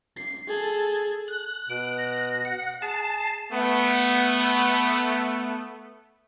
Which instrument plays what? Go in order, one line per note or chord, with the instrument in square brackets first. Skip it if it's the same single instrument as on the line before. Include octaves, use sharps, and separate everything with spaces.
[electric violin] C7
G#4 A4
[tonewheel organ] F#6
[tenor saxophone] B2 [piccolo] D7
[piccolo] A#6
[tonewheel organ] F#5
[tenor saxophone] G#4 [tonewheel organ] A5 [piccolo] C7
[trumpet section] A3 B3